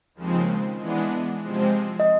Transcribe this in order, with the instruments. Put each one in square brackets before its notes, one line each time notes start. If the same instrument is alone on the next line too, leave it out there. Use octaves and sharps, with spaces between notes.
[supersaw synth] D#2 C#3 F3 G#3 C4
E3 G#3 B3 D4
C3 F3 G#3 C4
[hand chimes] D#5